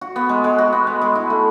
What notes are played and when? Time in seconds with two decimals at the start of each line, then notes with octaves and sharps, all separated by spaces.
0.01 F#4
0.16 B3
0.29 G#3
0.44 G#3
0.58 F#4
0.72 B3
0.87 G#3
1.01 G#3
1.15 E4
1.30 A3